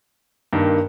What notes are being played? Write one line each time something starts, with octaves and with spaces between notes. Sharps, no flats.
G2 D#3 A#3